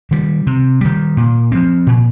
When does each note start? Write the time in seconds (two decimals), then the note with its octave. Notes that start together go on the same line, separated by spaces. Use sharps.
0.11 D#3 G3
0.47 C3
0.81 D#3 G3
1.17 A#2
1.52 F3 C4
1.87 A#2